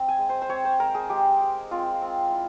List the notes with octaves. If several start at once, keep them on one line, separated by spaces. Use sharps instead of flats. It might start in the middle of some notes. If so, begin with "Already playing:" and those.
Already playing: C4
G#5
G#3
C5
C5
C4 C#5
C5
G#3 A#4
G#4
G#3 G4
G#3
C4 F4
C4
E4